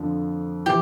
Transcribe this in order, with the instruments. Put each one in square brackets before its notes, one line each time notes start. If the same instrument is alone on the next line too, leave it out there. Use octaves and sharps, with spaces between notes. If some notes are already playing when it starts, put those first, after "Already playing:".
Already playing: [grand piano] F2 D3 F3
[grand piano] E3 [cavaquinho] G4